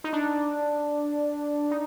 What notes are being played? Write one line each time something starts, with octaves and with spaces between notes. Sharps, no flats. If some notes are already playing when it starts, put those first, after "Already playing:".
D#4
D4
D#4